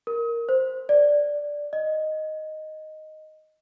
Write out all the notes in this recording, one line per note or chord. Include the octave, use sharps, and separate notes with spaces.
A#4
C5
D5
D#5